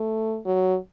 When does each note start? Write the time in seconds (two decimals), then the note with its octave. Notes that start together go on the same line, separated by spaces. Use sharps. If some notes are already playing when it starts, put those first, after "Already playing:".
Already playing: A3
0.45 F#3